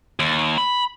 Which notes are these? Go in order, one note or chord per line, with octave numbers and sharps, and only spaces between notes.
D#2
B5